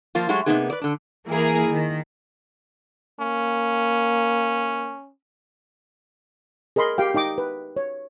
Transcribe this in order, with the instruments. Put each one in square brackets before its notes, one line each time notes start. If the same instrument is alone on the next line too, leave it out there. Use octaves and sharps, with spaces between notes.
[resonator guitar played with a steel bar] F3 A#3 F4
F#3 G#3 A3 F#4 G4
C3 E3 A#3 B3 D#4 G#4
B4 D5
D3 D4
[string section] E3 A#3 E4 G#4 A#4
D#3
[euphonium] A#3 [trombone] C#4
[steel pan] G#4 A#4 D#5 B5 C6
G4 F5 G5
D#4 D#5 G5 D6
B4
C#5